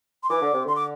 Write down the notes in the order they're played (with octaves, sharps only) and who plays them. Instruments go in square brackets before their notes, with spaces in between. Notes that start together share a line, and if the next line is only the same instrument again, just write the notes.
[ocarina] C6
[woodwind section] E3 [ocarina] D6
[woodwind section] D3
C3
[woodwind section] D3 [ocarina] C6
[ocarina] D6